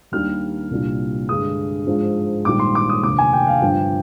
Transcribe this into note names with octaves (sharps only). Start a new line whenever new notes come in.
D#2 D#3 G3 A#3 D4 F6
C2 A#2 G3 D4
G2 D3 G#3 D#6
G#2 F3 G#3 D4
A#1 G#2 D#3 G3 D6
C6
D6
D#6
F1 D#2 D3 D6
G#5
G5
F5
G1 G2 F3 G5